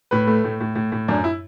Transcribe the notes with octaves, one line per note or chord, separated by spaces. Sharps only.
A2 B4
A3
A2
A2
A2
A2
F#2 D4
E4